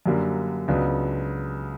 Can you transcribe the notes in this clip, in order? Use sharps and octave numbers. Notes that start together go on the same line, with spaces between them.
F#2 D3 G3 A#3
C#2 C#3 F#3 B3 D4